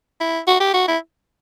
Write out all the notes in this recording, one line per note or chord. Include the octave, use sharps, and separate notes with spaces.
E4
F#4
G4
F#4
E4